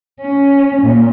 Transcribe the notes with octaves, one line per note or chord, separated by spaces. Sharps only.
C#4
A#2